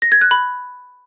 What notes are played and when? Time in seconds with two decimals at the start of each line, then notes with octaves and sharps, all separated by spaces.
0.02 A#6
0.12 G#6
0.21 F#6
0.31 B5